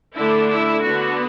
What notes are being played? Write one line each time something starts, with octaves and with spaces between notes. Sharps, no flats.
D3 A3 D4 E4
E4
D3 B3 D4 F#4